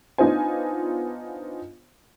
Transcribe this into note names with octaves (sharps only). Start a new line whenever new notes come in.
B3 D4 D#4 F4 C5 G#5